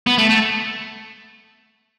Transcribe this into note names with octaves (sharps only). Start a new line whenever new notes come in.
B3
A3
A3